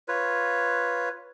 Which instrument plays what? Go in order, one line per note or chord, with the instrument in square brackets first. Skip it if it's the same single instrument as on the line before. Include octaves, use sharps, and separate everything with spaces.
[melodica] F4 B4 C#5